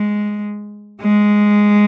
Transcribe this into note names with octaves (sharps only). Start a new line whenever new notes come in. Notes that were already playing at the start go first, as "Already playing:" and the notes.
Already playing: G#3
G#3